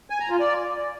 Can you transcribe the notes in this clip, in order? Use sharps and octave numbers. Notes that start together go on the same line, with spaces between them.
G#5
A#5
F4
D5